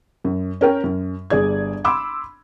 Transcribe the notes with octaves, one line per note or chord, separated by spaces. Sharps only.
F#2
C#4 A#4 G5
F#2
G1 G#4 D5 G#6
B5 C6 D6 E6